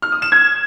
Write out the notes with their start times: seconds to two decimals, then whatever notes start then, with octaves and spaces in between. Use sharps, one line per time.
0.02 F6
0.12 D#6
0.22 E7
0.32 G#6